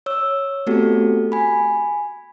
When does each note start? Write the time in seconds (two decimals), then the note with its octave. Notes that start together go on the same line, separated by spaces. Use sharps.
0.06 C#5 E6
0.67 A3 B3 C4 F#4 G4 A4
1.32 G#5 B5